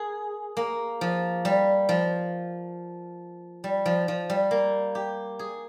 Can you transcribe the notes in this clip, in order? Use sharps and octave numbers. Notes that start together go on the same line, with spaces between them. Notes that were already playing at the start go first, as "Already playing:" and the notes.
Already playing: G#4 A#4
A#3
F3
G3
F3
G3
F3
F3
G3
A#3
G4
G#4